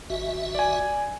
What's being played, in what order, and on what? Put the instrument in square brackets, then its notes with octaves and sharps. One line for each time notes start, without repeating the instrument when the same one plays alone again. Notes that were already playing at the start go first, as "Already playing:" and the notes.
[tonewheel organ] G#1 F#4 E5
[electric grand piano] D5 G#5